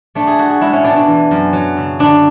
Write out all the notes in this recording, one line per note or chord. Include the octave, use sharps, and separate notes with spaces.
A3 D4
G#4
A3 F#4
G#4
G#3 E4
C#4
B2 D4
D4
E3
F#2
F#3
C#3
D3 D4